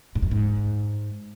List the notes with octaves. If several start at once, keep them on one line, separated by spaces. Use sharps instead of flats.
G#2
F#2
G#2